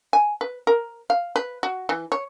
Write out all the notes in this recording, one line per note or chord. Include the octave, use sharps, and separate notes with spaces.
G#5
B4
A#4
F5
B4
F#4
E3
C#5